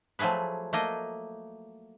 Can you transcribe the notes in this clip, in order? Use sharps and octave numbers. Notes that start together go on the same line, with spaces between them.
F3 F#3 A3 G#4 B4
A3 A#3 D#5